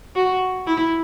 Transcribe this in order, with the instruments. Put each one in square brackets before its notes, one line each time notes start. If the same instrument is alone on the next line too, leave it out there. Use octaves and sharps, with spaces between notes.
[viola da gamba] F#4
E4